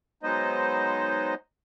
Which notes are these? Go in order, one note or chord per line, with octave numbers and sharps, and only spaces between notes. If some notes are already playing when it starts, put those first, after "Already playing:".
F#3 G#3 B3 D#4 C5 D#5